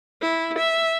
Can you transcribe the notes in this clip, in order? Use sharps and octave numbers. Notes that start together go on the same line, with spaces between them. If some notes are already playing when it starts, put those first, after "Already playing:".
E4
E5